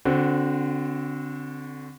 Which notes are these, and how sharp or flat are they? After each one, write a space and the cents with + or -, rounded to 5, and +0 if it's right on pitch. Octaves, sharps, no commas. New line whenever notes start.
D3 -20 C4 +0 F#4 +0